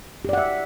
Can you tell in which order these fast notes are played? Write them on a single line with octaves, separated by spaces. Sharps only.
G4 D5 F#5 E5